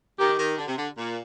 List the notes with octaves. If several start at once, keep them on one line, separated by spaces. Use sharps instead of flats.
D#3 G4
D#3
D3
C3
D3
A#2